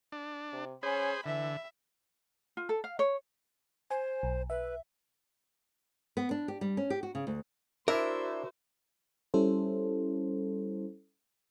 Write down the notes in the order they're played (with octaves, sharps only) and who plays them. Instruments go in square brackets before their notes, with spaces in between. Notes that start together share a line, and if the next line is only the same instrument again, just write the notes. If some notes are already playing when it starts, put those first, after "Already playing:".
[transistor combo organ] D4
[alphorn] C3
[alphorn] C#4 [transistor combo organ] G#4 C5 [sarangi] B5
[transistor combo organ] D3 [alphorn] E3 [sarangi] E5
[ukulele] F4
A4
F5
C#5
[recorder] C5 [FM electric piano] G#5
[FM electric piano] B1
[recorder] B4 [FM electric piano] E5
[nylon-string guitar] B3
D4
G4
G3
C#4
G4
F#4
C#3
D2
[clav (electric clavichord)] D4 E4 D5 [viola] F#4 C5 [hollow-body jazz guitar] A#4 [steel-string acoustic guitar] E5
[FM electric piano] G3 C#4 E4 A4 C5